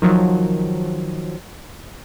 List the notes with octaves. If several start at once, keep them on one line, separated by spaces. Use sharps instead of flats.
D#3 F3 F#3